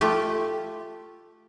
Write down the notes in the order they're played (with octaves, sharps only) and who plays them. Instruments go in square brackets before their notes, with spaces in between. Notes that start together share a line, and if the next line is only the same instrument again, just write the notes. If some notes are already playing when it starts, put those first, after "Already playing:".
[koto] A3 F4 G4